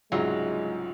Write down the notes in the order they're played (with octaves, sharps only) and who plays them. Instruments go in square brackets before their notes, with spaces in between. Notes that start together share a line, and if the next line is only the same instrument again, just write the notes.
[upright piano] C2 G#2 C#3 [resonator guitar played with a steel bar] F#3 [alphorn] G#3 [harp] F4